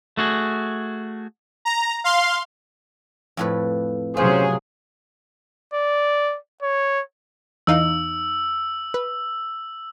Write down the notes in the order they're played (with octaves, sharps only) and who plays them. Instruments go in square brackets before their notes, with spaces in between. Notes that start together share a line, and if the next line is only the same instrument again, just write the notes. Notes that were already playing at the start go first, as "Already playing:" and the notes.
[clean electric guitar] A3 F#4 G#4
[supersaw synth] A#5
F5 C6
[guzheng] F2 A2 B4
[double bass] C3 F#3 [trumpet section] C#4 C5 [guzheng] F4 [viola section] G#4
[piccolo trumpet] D5
C#5
[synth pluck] E2 D#4 F5 [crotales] E6
[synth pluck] B4